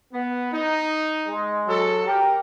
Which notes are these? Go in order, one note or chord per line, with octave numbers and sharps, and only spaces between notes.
B3
D#4
G#3
F#3 A4
G4 A#4